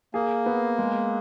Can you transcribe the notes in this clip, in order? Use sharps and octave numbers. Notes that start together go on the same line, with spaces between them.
A#3 G#4
B3
G#3